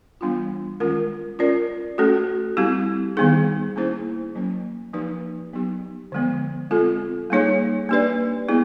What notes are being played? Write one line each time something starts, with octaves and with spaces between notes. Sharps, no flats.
E3 G3 B3 D4 F4
D#3 G#3 C#4 F4 A#4
C#4 F4 A#4 D5
A3 C#4 F#4 A4
G3 C4 E4 G4
D#3 G3 B3 D#4 G#4
A#3 C#4 E4 G#4 C5
F#3 A#3 C#4
F3 A#3 D#4 G4 B4
F#3 B3 D#4 G4
D3 F3 G#3 B3
G#3 C4 F4 A4
G3 A#3 D#4 G#4 C#5
A#3 D4 G4 B4 D5
G#3 B3 E4 G#4